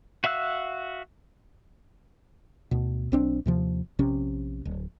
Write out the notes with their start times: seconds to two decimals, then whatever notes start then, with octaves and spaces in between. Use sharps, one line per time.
0.24 F#4 E5 F5 E6 F#6
2.71 D2 B2
3.12 B1 C4 D4
3.46 D#2 C3 F3
3.99 A#1 C3 C#4
4.65 D1